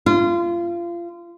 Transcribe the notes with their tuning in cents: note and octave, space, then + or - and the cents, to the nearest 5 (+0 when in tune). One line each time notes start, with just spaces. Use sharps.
F4 -25